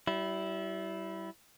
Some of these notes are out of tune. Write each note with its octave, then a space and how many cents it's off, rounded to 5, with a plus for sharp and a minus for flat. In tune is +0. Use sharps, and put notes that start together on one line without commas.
G3 -35 E4 +0